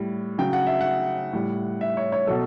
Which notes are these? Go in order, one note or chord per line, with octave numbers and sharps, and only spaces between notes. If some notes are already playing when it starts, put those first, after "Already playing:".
Already playing: A2 G3
C#3 F#3 G5
F#5
E5
F#5
A2 G3
E5
C#5
C#5
B2 F#3 A4